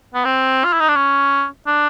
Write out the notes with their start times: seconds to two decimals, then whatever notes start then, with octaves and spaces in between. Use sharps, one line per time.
0.14 B3
0.25 C4
0.65 F4
0.73 E4
0.80 D#4
0.89 D4
0.96 C#4
1.67 D4